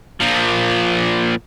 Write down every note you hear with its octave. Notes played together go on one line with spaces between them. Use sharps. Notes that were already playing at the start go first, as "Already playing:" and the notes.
A#2 F3